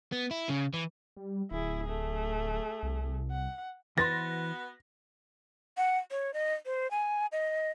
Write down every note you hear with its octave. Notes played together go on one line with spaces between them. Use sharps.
B3
E4
C#3
E3
G3
D1 E4 G#4
A3 G#4
C2
F#5
E3 B3 F#4 B4 C5 C6 A6 A#6
F#5
C#5
D#5
C5
G#5
D#5